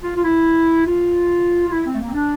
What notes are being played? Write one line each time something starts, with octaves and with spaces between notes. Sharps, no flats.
F4
F4
E4
F4
F4
E4
C4
A3
A#3
C4
D4